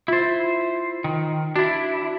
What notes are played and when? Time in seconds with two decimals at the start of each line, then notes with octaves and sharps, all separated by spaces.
0.08 E4 F4 C5 A6
1.04 D#3
1.56 D4 E4 F#4 A6